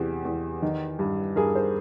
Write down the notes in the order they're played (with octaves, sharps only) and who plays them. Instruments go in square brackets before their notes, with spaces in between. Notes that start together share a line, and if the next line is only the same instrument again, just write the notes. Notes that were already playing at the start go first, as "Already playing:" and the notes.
Already playing: [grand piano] E2 C3 G4 G#4
E2
D#3
G2
G2 G#4 A#4
A#4 C5